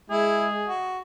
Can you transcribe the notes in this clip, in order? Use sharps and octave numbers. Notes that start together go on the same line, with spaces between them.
G#3 E4 G#4
F#4